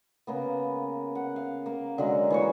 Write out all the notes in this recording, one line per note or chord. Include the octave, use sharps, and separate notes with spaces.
C#3 A#3 B3
F#5
F5
A#3
D3 F#3 G#3
E3 A#3 C#5